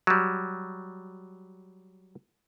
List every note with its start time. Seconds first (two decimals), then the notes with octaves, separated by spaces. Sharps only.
0.07 F#3 G3